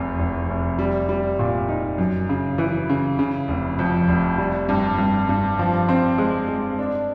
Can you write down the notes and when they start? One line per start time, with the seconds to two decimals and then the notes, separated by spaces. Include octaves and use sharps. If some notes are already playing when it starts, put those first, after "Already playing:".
Already playing: F1 E2
0.19 F1
0.49 F1
0.79 G3
1.09 G3
1.39 A#2
1.69 D#4
1.98 F#2
2.29 C#3
2.58 E3
2.89 C#3
3.19 C#3
3.48 F1
3.79 F2
4.08 F1
4.38 G3
4.69 G2
4.98 G2
5.29 G2
5.59 F3
5.89 C4
6.18 G#3
6.48 G#3
6.79 D4